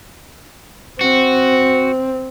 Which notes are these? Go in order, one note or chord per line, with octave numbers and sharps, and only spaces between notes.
C4 F#4